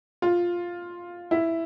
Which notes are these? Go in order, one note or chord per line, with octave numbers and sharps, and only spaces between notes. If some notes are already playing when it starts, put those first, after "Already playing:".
F4
E4